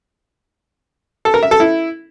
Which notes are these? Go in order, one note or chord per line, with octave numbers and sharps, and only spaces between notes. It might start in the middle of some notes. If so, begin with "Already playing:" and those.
A4
A#4
E5
A4
E4